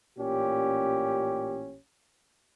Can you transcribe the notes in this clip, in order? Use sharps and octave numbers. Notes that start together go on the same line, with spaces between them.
A1 A#2 C#4 G4